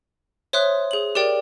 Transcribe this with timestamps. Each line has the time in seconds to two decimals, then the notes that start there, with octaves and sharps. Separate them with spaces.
0.53 C5 C#5 E5 C6 D#6 F#6
0.91 G#4 F#7
1.15 G4 A#4 D5 G5